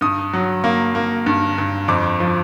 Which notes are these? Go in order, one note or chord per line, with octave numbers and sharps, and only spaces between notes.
G2 D#6
F#3
A#3
A#3
G2
G2
F2 D6
F3